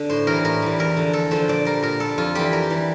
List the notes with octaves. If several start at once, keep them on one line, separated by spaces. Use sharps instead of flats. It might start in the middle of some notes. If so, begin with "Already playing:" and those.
Already playing: D3 D4
A2 C5
E3 G3 A#4
A2 A#4
E3 G3
E2 A#4
D3 F3
E2 A4
D3 F3 C5
A#2 D5
G3 A#4
A#2 A#4
G3 A4
F2 F4
E3 G3 G4
F2 A#4
E3 G3